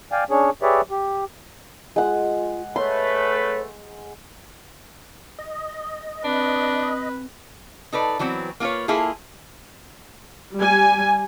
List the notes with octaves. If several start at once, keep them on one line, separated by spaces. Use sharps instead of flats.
D5 F5 G5 G#5
C#4 D4 G#4 C#5
G4 G#4 B4 C#5 D5 E5
G4
G#3 F4 F#5
A3 B4 C#5 C6
D#5
C4 D4 B4
D#4 A4 B4 D5
E3 F#3 B3 C4
A#3 F4 G4 B4 C#5
A#3 E4 F4 G#4 A4
G3 G#5